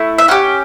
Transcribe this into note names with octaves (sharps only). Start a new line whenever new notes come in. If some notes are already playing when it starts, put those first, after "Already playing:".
Already playing: A3 E4
E5
C#4 E4 G4 F#5